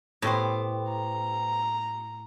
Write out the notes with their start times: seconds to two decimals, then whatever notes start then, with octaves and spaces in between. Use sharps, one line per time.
0.22 A2 B3 G4 C5
0.89 A#5